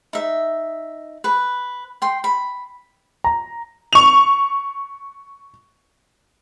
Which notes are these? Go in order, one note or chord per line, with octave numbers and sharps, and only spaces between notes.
D#4 E5
B4
G5 C6
B5
A#5
C#6 F7